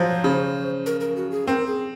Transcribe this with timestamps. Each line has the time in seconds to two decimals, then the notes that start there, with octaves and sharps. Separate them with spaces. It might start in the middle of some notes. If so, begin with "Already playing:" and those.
Already playing: F3 F#3 C5
0.24 C#3
0.86 A#4
1.00 A#4
1.17 F#4
1.31 G#4
1.47 C4 A#4
1.67 G#4